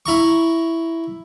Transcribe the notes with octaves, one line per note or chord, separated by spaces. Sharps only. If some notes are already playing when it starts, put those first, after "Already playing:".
E4 A#5 C#6